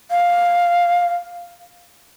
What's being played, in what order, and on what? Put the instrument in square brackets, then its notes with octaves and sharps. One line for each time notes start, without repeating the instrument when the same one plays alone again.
[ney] F5